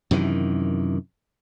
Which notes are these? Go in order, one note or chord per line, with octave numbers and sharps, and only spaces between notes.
F#2 C3 D#3 E3